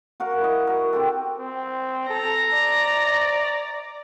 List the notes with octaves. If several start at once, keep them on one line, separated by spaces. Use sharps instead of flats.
F#4 A#4 F5 F#5
E4 D#5
F#4 A#4
C4 G4 A4
C4
A4 A#5
D5